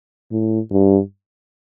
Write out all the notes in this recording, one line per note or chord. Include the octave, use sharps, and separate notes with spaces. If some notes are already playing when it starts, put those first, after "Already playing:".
A2
G2